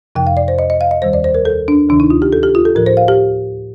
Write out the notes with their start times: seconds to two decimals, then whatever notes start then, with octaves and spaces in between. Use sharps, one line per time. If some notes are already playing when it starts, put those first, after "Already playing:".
0.15 F2 C3 F3 G5
0.27 F5
0.37 D5
0.48 C5
0.59 D#5
0.70 D#5
0.81 F5
0.91 D#5
1.02 D#2 D#3 G3 C5
1.13 D5
1.24 C5
1.35 A#4
1.45 A4
1.68 D4
1.89 D2 C3 D#3 D4
2.00 D#4
2.10 F4
2.22 G4
2.32 A4
2.43 G4
2.55 F4
2.65 A4
2.75 A2 F3 A#4
2.86 C5
2.97 F5
3.08 G4